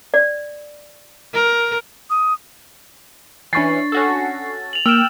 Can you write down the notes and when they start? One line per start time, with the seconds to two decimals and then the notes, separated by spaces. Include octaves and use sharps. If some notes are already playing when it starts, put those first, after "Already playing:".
0.14 D5
1.33 A#4
2.10 D#6
3.53 E3 C#4 D4 C#6 A6 C7
3.92 C#4 F#4 A4
4.73 F7 F#7
4.86 A#3 G5 E6 F6 E7